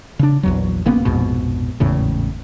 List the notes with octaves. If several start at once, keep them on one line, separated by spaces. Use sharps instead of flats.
C#3 D4
A#1 E2 F#3
E1 A#3 B3 C#4
A#1 F2 G#2 B2
G#1 E2 A2 C#3